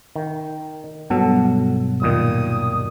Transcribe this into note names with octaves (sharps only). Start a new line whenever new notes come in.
D#3
G2 B2 F#3 A4 F#5
D#2 A#2 D#3 D#6